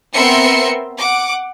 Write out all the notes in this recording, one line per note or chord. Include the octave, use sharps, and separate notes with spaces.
B3 C4 A#4 E5 C6 C#7
F#5 D6